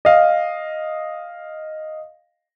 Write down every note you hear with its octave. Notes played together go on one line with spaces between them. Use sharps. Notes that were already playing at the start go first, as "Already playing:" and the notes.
D#5 F5